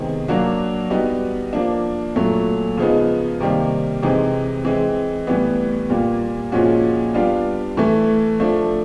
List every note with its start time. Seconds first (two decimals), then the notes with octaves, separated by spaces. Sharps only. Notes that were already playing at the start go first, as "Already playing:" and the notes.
Already playing: C3 D#3 G#3 B3
0.28 F#3 A#3 D4 F#4
0.90 G3 B3 D#4 F#4
1.53 F3 A#3 D4
2.16 A#2 F#3 A3
2.77 C#3 F3 G#3 B3 D#4
3.40 C3 D#3 G3 A#3
4.02 C3 E3 G#3 C4 D#4
4.65 E3 G#3 C4
5.27 A2 E3 G3 B3
5.90 A#2 G3 A#3
6.52 A#2 F3 G#3 C#4 F#4
7.14 G3 B3 D4 F4
7.77 A2 E3 A3
8.40 F3 A3 D4